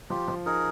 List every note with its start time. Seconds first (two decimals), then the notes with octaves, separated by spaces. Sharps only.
0.10 F3 F4 G4
0.28 F3
0.46 D#4 G#4 A#4